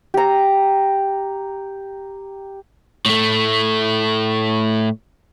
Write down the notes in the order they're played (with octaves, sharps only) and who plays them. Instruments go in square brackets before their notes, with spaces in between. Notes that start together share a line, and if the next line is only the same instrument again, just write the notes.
[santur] G4 A#5
[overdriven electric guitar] A2 A3